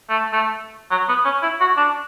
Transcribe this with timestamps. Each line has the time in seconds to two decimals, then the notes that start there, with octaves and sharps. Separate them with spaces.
0.10 A3
0.33 A3
0.91 F#3
1.08 B3
1.25 C#4
1.42 E4
1.61 F#4
1.77 D4